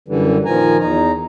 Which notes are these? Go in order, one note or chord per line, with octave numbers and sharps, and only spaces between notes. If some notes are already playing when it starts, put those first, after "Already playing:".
F#2 D3 E3 G3
A#2 D#3 F3 G#5 A#5
E2 D#4 A#5